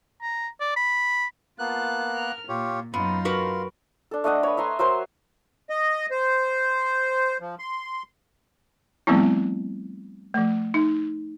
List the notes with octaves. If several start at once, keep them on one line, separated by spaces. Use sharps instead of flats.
A#5
D5
B5
A#3 B3 F4 A5 F#6
A#4 F6
A#2 F4 G4 C#5
F#2 B3 D#4 F4 C6
F#4 A#4 B4
D4 A4
A3 D4 D#5 F#5
B4 C#5
E5 G#5 A#5 C6
F#3 A#4 C5 C6
D#5
C5
F3
C6
F3 G3 A3 B3 C4 E4
F3 A3
D#4